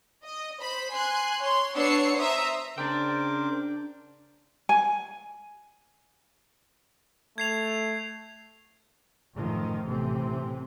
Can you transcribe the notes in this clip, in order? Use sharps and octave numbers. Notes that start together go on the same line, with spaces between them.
D#5
C5 B5
G#5 C6 F#6
C#5 C6
B3 D4 C#5 E6 C7 C#7
C5 E5 A#5 D#6 E6
C#3 D4 A#4 C5 G5 D6
G#5
A3 G#6 C7 F7
F#2 A2 D#3 F3
A1 A2 C3 E3 C4